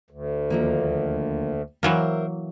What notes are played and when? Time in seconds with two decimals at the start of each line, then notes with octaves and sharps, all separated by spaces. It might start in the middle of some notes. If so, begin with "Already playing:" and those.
0.10 D2
0.50 D#2 F3 A#3
1.83 E3 F#3 A#3 A#4 C5 E5